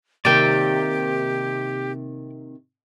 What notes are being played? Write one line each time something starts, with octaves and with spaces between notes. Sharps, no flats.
C3 D#3 A#3 G4 D5 G5